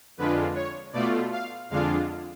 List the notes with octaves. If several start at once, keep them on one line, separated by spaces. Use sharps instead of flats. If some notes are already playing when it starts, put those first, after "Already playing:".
F2 D3 G#3 D4 F4 B4
C#5
B2 A3 F4 D5
F5
F2 D3 G#3 D4 F4 F5